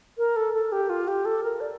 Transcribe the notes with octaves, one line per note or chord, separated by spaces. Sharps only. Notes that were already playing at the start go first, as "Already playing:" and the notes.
A#4
A4
A4
G4
F4
G4
A4
A#4
D5